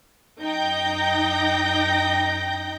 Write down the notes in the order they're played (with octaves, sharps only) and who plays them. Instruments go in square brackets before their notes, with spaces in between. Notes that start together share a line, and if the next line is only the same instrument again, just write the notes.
[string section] F#2 D#4 G5 G6 A#6